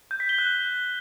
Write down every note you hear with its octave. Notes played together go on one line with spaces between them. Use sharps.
G6
B6
G7
F#6